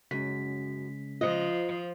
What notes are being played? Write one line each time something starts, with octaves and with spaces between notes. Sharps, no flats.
F#2 C#3 G#3 C#4 B6
F3 F4 C5 D#5 D#6